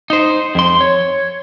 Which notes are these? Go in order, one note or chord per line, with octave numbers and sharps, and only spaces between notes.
D#4 C5
F2 C6
C#5